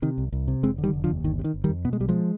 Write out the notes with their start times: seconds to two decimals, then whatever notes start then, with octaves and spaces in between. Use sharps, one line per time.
0.02 C3 D#3
0.18 C2
0.32 C2
0.48 C3
0.63 F1 G#3 C4
0.78 D3
0.84 D#3 G3
0.93 F1
1.04 D3 F3
1.09 D#2
1.24 G1 D#3
1.39 C3
1.44 D#3
1.54 G1
1.64 D#3 G3
1.69 F2
1.85 B2 B3
1.93 G#3
2.00 B1 G3
2.09 F3 G#3